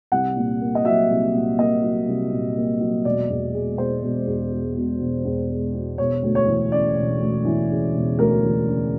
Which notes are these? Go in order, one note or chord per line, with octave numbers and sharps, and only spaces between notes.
C2 F#5
A#2
A#3
D#5
F#3 E5
C2
A#2
A#3 D#5
F#3
C2
A#2
A#3
F#3
E1 D5
E2
G#3
B2 C5
E1
E2
G#3
B2
E1
E2
G#3
B2
E1 C#5
D2
C#5
E3
C#3 D5
E1
D2
E3
C#3
E1
D2 A#4
E3
C#3